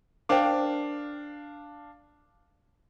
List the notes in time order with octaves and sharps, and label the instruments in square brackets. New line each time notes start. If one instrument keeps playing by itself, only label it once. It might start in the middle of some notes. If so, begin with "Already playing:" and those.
[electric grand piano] D4 F5 D6 [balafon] A#4 C5 G5